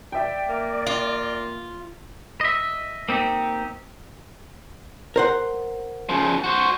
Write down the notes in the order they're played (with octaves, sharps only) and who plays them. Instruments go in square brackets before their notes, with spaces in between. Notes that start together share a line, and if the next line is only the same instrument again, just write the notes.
[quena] D5 [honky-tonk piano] E5 G5
[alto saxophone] A#3
[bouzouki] F4
[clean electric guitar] D#5 E5
A#3 C4 D#4 G4
[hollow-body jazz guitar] A#4 C5 F#5
[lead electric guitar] C#3 F3
F#4 C5